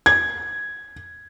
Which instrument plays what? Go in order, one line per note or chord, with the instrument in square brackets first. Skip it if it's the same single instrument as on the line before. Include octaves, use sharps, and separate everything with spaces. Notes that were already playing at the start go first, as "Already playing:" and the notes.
[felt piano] G#6